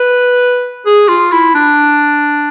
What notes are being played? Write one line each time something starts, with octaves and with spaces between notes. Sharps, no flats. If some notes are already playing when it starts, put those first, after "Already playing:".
Already playing: B4
G#4
F4
E4
D4